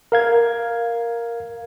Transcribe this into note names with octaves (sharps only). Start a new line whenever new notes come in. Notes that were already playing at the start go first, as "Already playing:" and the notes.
A#4 F5 G#6